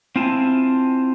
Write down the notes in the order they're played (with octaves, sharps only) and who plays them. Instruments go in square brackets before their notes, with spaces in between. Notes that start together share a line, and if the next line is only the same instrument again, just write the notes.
[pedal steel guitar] C4 E4 F4 G#5 A5